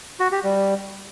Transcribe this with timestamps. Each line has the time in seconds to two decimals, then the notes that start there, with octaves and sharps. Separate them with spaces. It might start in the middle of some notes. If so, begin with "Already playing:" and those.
0.20 F#4
0.32 G4
0.44 G3